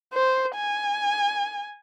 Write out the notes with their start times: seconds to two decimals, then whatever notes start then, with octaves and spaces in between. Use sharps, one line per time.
0.13 C5
0.55 G#5